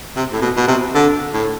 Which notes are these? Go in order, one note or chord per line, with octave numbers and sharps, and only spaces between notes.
C3
A2
B2
B2
C3
D3
A2